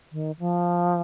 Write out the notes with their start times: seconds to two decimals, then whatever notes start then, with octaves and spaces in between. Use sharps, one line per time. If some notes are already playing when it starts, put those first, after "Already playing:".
0.12 D#3
0.39 F3